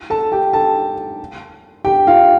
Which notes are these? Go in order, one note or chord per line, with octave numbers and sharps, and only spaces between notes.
A4 A5
G4 G5
A4 A5
G4 G5
F4 F5